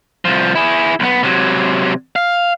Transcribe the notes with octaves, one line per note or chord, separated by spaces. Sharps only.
C2 F3
E4 G#4
B1 B3
C3 F#3
F5